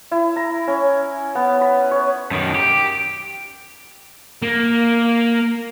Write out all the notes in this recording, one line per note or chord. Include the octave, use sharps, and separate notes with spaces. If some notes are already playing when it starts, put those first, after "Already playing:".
E4
A#5
C#4
B3
B5
C#5
F#2 D#3
G4
A#3